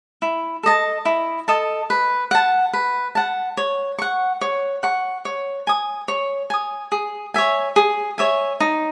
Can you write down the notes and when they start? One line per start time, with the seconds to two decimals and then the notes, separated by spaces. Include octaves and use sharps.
0.22 E4
0.63 A4 D#5 A5
1.05 E4
1.48 A4 D#5 A5
1.90 B4
2.31 F#5 A5
2.73 B4
3.15 F#5 A5
3.57 C#5
3.99 F#5 C#6
4.41 C#5
4.83 F#5 C#6
5.25 C#5
5.67 G#5 D#6
6.08 C#5
6.50 G#5 D#6
6.92 G#4
7.34 C#5 E5 G#5
7.76 G#4
8.18 C#5 E5 G#5
8.60 D#4